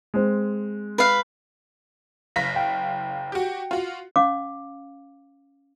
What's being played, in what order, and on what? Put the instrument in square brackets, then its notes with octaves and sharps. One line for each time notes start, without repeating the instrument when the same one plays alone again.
[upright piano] G#3 C4
[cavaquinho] B4 F5
[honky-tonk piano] F#1 F5 B6 [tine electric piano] A#6
[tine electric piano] G5
[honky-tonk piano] F#4 G4
F4 F#4
[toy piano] C#4 F5 D6